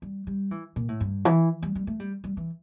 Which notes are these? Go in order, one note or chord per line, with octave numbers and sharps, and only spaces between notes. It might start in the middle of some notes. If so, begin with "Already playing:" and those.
G3
G3
E3
A#2
A2
G2
E3
G3
G3
A3
G3
G3
E3